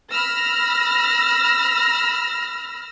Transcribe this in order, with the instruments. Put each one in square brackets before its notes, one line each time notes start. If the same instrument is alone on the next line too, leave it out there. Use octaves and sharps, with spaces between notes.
[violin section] B5 E6 F6 A#6